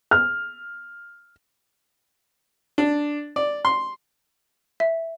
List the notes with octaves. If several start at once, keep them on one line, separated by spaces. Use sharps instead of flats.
F6
D4
D5
C6
E5